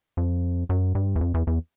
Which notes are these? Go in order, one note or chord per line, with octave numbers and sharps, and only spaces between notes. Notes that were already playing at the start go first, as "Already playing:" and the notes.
F2
F#2
G2
E2
F2
E2
E2